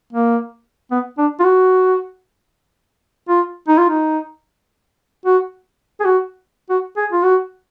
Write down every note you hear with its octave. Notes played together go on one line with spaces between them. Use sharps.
A#3
B3
D4
F4
F#4
F4
D#4
F4
D#4
F#4
G#4
F#4
F#4
G#4
F4
F#4